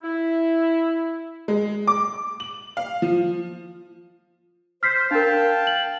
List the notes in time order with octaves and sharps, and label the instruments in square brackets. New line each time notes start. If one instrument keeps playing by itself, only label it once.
[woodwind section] E4
[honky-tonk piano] G#3
D6
F#7
F5
F3
[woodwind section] C5 [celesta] F6 B6 C7
[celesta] D4 A#4 [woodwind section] F5 G5 A5
[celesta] F#7